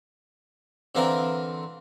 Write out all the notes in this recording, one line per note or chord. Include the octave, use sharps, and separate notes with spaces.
D3 E3 C4 F4 A#4